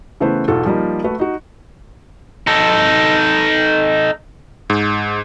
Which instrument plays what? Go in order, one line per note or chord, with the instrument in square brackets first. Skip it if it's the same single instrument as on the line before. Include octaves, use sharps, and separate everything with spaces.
[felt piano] C#3 E3 A3 B3 B4 C5
B1 E2 F4 F#4 A4
F3 G3 A#3 D#4
A3 F#4 B4
D#4 F#4
[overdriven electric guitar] D#4 A4
[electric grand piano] G#2